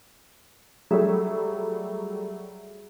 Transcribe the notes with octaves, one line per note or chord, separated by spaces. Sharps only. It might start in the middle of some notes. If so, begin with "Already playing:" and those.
F#3 G3 A3 G#4 E5